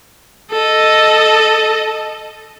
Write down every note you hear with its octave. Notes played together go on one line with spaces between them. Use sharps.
A4 D#5